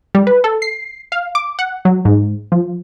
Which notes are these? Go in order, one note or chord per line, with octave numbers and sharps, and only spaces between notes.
G3
B4
A4
C7
F5
D6
F#5
F#3
G#2
F3